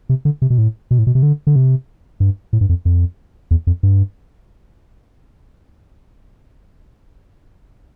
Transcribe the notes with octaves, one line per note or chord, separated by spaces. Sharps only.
C3
D3
C3
B2
A2
B2
A2
B2
C3
D3
D3
C3
G2
A2
G2
F2
F2
E2
F2
G2